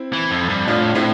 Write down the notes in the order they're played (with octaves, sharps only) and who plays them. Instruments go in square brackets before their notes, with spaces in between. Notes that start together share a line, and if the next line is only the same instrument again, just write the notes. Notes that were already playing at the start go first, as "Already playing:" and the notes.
Already playing: [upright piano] C4 E4
[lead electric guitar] E3
F2
G2
[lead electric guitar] A2 [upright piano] D4 F4
[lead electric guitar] A2 [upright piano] C4 E4